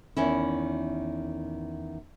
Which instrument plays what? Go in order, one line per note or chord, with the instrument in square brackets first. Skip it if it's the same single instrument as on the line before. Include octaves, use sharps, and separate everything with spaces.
[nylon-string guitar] E2 D#3 C#4 E4